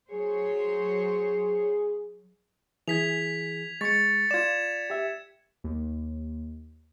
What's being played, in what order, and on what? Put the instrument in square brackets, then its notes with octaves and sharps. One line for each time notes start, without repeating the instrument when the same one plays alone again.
[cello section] F#3 C5 C#5 [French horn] G#4
[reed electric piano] E3 G#4 [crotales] G#6 B6 F7
[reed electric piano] G#3 C#6 [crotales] A6 C#7
[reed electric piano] F4 D5 [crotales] G#6 E7
[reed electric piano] G4 E5
[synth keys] D#2